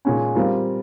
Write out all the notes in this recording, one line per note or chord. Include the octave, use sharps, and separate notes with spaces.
A#2 G#3 C#4
G3 C4 F4 A#4